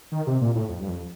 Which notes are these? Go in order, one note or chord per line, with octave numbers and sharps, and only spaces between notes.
D#3
C3
A#2
A2
F2
G2
F2